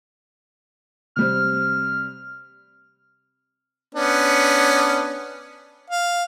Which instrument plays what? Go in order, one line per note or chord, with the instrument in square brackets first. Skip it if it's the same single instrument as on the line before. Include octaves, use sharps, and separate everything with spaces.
[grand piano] C3 G3 C4 [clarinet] F6
[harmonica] B3 C#4 D4
F5